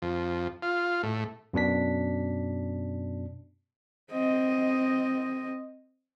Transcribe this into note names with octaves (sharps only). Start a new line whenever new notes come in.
F2
F4
A2
F#2 B2 D4 B6
C4 D#5